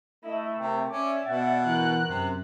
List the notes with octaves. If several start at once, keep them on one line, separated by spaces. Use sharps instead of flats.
A3 E4 D#5
C3 A#4 G5
C#4 D5 E5 D6
B2 F#5 A6
E3 A#4 F#6
F#2 C3